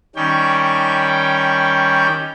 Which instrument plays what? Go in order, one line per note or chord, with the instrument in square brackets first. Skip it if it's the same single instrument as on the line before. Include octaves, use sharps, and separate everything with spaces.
[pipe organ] D#3 G3 C#4 G5